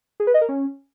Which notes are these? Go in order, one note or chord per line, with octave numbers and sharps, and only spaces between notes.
G#4
B4
D#5
A#4
C#4